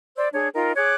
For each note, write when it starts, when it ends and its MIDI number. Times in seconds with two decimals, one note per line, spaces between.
0.17 0.29 72
0.17 0.29 74
0.17 0.29 88
0.34 0.48 62
0.34 0.48 68
0.34 0.48 73
0.54 0.72 63
0.54 0.72 65
0.54 0.72 70
0.54 0.72 79
0.76 0.95 68
0.76 0.95 73
0.76 0.95 86
0.76 0.95 90